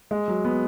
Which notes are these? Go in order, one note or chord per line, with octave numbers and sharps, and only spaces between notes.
G#3
F#3
B3